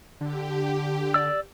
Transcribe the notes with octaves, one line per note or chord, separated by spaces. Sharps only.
D3 G4
D5 E6